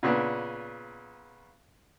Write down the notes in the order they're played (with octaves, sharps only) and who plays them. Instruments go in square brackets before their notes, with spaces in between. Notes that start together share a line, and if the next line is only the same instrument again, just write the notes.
[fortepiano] A#2 C#3 B3 D4